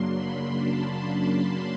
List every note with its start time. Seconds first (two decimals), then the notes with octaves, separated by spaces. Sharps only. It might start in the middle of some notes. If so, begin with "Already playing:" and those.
Already playing: F#2 C#3 F#3 A#3 D4 C6
0.14 B5
0.60 A5